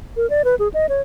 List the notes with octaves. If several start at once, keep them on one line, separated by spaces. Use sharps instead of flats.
A#4
D5
B4
G#4
D#5
C#5